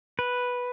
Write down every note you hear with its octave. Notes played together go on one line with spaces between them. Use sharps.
B4